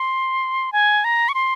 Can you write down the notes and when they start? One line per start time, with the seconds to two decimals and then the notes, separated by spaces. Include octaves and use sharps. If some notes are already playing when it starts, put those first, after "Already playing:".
Already playing: C6
0.72 G#5
1.04 A#5
1.29 C#6
1.34 C6